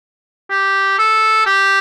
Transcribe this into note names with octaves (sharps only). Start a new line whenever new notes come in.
G4
A4
G4